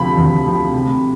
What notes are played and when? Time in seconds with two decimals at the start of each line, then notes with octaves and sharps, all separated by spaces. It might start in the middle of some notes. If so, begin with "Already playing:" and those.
Already playing: D2 C3 F3 B5
0.17 D2
0.46 C3 F3
0.74 C3